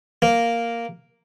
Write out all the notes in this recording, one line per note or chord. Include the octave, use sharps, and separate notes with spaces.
A#3